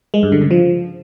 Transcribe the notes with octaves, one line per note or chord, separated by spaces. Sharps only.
G#3
G2
D3
C#3
F3